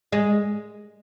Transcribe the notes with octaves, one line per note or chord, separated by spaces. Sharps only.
G#3